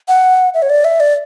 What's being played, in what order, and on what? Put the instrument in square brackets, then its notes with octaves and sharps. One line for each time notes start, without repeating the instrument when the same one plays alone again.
[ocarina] F#5
E5
C#5
D5
E5
D5